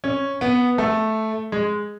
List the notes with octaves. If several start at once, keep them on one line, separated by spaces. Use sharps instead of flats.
C#4
B3
A3
G#3